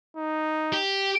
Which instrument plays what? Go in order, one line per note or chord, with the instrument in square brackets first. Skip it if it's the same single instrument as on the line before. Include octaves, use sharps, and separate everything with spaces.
[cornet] D#4
[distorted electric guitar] G4